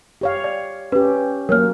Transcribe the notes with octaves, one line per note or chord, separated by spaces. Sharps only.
G4 C#5 F5
D5
C#4 G4 B4
F#3 A#3 A#4 C#5 F6